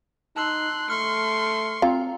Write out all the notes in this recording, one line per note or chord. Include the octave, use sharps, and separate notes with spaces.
D#4 A5 C6 E6 F#6
A3 C6 C#6 F6
C4 F4 F5 A#5